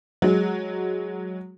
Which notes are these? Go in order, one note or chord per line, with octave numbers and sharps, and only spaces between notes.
F#3 G#3